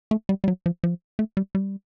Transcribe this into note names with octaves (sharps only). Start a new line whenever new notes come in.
A3
G3
G3
F#3
F3
F3
A3
G3
G3